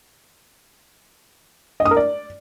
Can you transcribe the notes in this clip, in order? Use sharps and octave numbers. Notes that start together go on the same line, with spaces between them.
D#5
D#6
A#4
D5